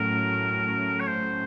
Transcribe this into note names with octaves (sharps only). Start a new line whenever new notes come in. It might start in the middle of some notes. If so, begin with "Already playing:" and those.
Already playing: A2 F#3 A3 C#4 A#4
C#5
C5